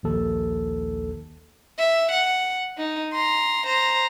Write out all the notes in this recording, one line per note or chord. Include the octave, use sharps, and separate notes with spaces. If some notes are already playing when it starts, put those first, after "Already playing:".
A#1 D#2 A4
E5
F#5
D#4
A#5 C6
C5 A#5